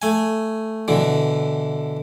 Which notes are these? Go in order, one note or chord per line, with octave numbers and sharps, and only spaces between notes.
A3 G#5
B2 D3 E3